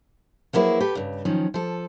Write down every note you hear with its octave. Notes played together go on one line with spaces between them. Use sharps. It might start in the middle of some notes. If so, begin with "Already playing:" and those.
F3 F#3 A#3 E4 G#4 B4
G4 A4 B4
G2 C#3
D#3 F3 F#3 C#4
F3 A4